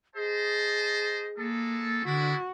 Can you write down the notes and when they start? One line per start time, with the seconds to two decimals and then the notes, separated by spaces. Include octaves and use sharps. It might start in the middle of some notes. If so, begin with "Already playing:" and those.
0.16 G#4 C5 D#5 A5
1.38 G#3 A#3 A4
2.05 D3 G#3 D4 E4 F#4